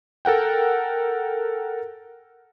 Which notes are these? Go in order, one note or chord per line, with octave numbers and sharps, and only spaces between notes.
A4 A#4 F#5 G5